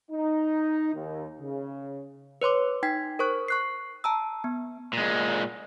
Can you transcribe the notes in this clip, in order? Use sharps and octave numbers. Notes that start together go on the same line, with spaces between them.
D#4
D#2
C#3
B4 C#5 C6 D6
D#4 G5 G#6 B6
A#4 C5 C#6 F#6
C#6 F#6 C7
A5 A#5 E6
B3
A#2 G#3